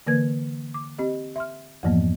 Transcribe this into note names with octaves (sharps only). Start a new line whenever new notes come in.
D3 E3 A#3 A#4 B4 G#6
D6
C4 G4 D#5
E5 C6 F6
F2 G#2 E3 F3 A#3 B3